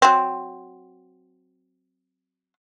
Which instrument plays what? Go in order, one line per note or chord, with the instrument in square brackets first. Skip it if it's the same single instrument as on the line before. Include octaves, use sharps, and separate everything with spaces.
[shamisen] F#3 C4